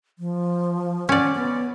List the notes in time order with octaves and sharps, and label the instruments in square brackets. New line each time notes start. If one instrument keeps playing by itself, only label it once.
[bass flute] F3
[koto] C#4 D5 [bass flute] F#5
[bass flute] B3